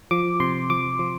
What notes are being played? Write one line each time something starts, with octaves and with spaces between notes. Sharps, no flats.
F3 D6
C3 C6
F3 D6
F3